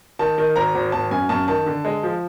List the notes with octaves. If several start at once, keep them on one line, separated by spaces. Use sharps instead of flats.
D#3 A5
D#3
G#1 A#5
G#1
G#1 A5
F#2 G#5
F#2 A5
D#3 A5
D3
G#3
F3